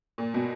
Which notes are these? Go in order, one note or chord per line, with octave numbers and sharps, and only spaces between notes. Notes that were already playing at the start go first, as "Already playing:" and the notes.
A#2
B2